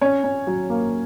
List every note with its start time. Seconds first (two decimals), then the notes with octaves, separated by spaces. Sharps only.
0.01 C#4 C#5
0.24 C#4
0.47 F#3
0.70 A#3